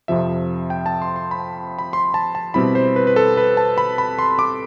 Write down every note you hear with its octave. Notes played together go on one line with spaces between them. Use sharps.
F2 C3 F3 E5
G5
A5
C6
C6
B5
B5
C6
A5
A5
B2 G3 C4 E4 B5
C5
B4
B4
A4
B4
A5
B5
B5
C6
D6